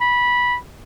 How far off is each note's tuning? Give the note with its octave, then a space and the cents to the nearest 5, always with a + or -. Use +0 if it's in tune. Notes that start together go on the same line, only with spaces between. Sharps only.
B5 -15